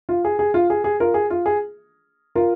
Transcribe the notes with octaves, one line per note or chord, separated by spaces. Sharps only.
F4
G#4
G#4
F4
G#4
G#4
F4 A#4
G#4
F4
G#4
F4 A#4